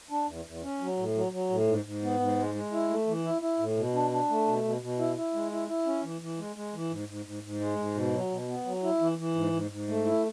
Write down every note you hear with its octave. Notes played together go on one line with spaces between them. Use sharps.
D4
E2
E2
C#4
F#3
A2
F#3
F#3
A2
G#2
G#2
B3
G#2
G#3
G#3
E4
A3
E3
E4
E4
A2
B2
D4
D4
A3
B2
B2
B2
E4
E4
G#3
E4
E4
C#4
E3
E3
G#3
G#3
E3
G#2
G#2
G#2
G#2
G#3
G#2
B2
F#3
B2
B3
F#3
E4
E3
E3
G#2
G#2
G#2
A3
E4